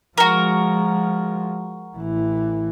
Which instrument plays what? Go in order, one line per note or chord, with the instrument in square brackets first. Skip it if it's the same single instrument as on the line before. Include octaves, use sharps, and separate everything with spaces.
[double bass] F3 G#3 [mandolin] F#4 A#4
[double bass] A1 E3